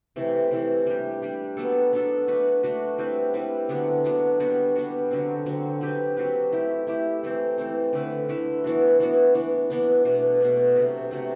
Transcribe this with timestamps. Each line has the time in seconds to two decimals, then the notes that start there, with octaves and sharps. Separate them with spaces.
0.16 C3 E3 A3
0.51 C3 E3 A3
0.87 G3 D4 G4
1.22 G3 D4 G4
1.57 F#3 B3 D4 A4
1.92 F#3 B3 D4 A4
2.28 A3 D4 F#4 B4
2.63 A3 D4 F#4 B4
2.98 G3 C4 E4 B4
3.34 G3 C4 E4 B4
3.69 D3 F#3 B3 D4
4.04 D3 F#3 B3 D4
4.40 G3 B3 D4 F#4
4.75 G3 B3 D4 F#4
5.11 D3 F#3 C4
5.46 D3 F#3 C4
5.81 F#3 C4 G4 B4
6.17 F#3 C4 G4 B4
6.52 A3 E4 G4
6.87 A3 E4 G4
7.23 E3 A3 C4
7.58 E3 A3 C4
7.93 D3 A3 E4 B4
8.29 D3 A3 E4 B4
8.64 E3 B3 D4 F#4
8.99 E3 B3 D4 F#4
9.34 E3 B3 D4
9.70 E3 B3 D4
10.05 B2 A3 D4
10.40 B2 A3 D4
10.76 C3 F#3 A3
11.11 C3 F#3 A3